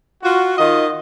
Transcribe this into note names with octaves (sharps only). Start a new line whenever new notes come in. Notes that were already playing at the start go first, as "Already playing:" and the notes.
F4 F#4
D#3 F4 D#5